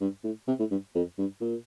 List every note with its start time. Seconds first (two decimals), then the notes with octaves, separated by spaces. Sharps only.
0.01 G2
0.24 A2
0.48 C3
0.59 A2
0.71 G2
0.95 F2
1.18 G2
1.41 A#2